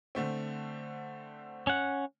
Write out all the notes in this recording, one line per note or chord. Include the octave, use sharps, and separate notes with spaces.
D3 A3 C4
C#4 F#5